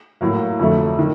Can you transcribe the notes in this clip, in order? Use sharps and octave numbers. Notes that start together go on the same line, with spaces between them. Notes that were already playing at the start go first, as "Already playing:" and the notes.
A2 F#3 A#3
F2 D3 F#3 A3
D#3